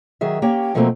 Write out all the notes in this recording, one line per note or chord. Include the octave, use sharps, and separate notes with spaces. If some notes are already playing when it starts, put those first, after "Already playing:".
D#3 F#3 G#4 E5
A#3 C#4 G4 C#5 G5
B2 F3 F#3 A3 A#3 C4